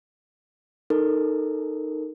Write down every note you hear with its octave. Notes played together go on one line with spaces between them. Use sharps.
D#4 A4 A#4